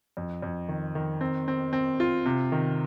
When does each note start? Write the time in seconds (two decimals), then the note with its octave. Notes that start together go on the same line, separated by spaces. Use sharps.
0.17 F2
0.42 F2
0.69 D#3
0.95 D#3
1.21 C4
1.48 C4
1.73 C4
2.00 F4
2.26 C3
2.52 D#3